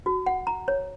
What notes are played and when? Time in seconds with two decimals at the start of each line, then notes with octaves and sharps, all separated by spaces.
0.06 F#4
0.26 F#5
0.47 A#5
0.68 C#5